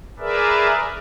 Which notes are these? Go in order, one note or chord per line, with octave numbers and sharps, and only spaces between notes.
G#4 A#4 B4 D5 E5